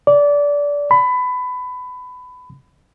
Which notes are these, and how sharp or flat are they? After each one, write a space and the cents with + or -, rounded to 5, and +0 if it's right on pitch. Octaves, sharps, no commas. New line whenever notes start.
D5 -20
B5 +20